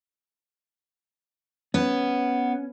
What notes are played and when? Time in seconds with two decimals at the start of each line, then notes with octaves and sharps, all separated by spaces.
1.74 B3 C#4